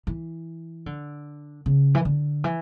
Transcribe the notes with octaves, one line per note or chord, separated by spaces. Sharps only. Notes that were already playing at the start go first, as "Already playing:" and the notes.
E3
D3
C#3
E3
D3
E3